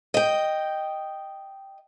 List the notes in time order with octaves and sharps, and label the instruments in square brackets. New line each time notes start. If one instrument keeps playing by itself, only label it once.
[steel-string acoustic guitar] D#5 G5